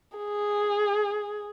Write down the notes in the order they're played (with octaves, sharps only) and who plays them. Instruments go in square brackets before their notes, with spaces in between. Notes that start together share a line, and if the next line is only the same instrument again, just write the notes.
[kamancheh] G#4